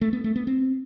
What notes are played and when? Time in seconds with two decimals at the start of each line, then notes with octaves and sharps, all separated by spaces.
0.01 A3
0.13 B3
0.24 A3
0.36 B3
0.47 C4